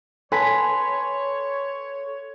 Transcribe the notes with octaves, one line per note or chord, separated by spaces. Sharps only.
A4 B4 C#5 G#5 C6 B6